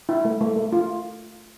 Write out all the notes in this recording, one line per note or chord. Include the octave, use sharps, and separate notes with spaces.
E4
A3
A3
A3
F4